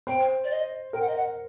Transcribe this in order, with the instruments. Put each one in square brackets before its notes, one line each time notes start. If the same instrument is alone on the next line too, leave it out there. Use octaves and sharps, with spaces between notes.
[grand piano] C5 [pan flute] G5
[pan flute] D5
D#5
[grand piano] A#4 [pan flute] G5
[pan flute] F#5
D#5
F#5